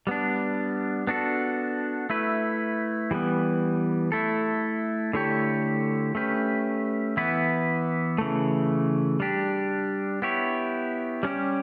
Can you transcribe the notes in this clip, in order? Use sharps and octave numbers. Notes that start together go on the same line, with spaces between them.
G3 B3 D4
B3 D4 F#4 A4
A3 E4 B4
E3 G3 B3
A3 E4 A4
D3 A3 E4 G4 C#5
A3 C#4 G4 B4
E3 B3 E4 B4
C#3 E3 A3
G3 D4 G4
B3 E4 G4 C#5
G3 C#4 G4